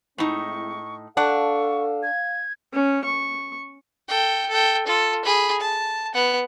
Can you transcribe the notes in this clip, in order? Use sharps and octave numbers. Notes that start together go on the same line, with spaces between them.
A2 G#3 C4 D#4 E4 C#6
D4 A4 F5 F#5 C#6
G#6
C#4
C#6
A4 G5
A4 G5
F4 A4
G#4 B5
A5
B3 F#5